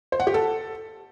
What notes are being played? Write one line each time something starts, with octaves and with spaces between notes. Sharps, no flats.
C5
F#5
G4
A4